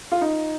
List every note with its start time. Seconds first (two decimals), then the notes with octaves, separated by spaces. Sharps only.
0.12 F4
0.21 D#4